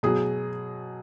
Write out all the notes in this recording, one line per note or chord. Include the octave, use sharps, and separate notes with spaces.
B2 F#3 G#4